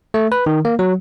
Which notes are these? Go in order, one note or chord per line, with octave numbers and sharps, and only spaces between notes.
A3
B4
D#3
A#3
F#3